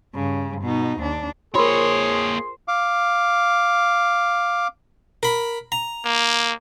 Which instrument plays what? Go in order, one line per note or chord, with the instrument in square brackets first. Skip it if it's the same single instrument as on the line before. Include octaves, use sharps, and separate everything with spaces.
[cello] G2 C#3
B2 D#4
D#2 D4
[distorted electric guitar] A#3 C#5 [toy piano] F4 A#4 [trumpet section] G#4 C6 [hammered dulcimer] C5
[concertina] F5 D6
[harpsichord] A#4 B5
A#5
[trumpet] A#3